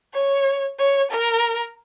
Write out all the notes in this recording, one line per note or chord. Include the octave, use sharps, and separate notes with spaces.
C#5
C#5
A#4